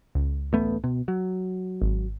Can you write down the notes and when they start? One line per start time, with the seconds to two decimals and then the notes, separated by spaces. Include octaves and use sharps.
0.15 C#2
0.53 A1 A3 B3
0.84 B2
1.08 F#3
1.82 G#1